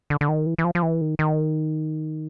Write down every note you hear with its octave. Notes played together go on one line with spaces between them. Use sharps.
D3
D3
D#3
E3
E3
F3
F3
E3
D#3
D#3